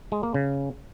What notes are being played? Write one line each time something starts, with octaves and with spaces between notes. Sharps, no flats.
G#3
A#3
C#3